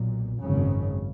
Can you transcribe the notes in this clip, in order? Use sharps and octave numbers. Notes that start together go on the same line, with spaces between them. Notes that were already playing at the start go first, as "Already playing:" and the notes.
Already playing: B1 A#2
G#1 F#2 C#3